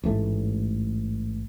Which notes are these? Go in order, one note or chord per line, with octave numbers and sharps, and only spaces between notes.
A1 G#2 A3